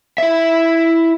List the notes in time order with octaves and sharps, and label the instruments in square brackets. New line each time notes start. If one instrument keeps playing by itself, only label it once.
[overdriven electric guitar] E4 E5